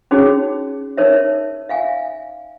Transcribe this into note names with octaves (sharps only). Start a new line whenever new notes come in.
C#4 D#4 F#4 G#4 C#5
D#4 A#4 C#5 E5
E5 F5 G#5